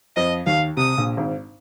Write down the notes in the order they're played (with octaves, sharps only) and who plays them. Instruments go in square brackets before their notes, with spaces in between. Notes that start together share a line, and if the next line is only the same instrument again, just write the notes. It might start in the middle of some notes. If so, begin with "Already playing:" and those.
[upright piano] F2 F3 [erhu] D#5
[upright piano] D#2 D#3 [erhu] F5
[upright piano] C2 C3 [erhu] D#6
[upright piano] A#1 A#2
G#1 G#2